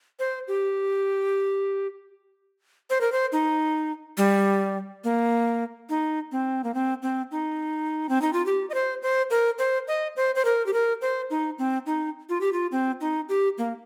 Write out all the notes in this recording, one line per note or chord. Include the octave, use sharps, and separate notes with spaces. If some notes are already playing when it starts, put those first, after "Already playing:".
C5
G4
C5
A#4
C5
D#4
G3
A#3
D#4
C4
A#3
C4
C4
D#4
C4
D#4
F4
G4
D#5
C5
C5
A#4
C5
D#5
C5
C5
A#4
G4
A#4
C5
D#4
C4
D#4
F4
G4
F4
C4
D#4
G4
A#3